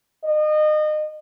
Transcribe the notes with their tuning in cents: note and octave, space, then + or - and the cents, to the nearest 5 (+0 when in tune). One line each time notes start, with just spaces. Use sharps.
D#5 -30